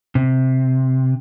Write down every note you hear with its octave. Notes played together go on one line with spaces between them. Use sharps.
C3